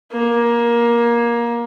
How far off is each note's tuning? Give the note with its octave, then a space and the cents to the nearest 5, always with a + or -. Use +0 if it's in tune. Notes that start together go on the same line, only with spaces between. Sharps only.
A#3 +20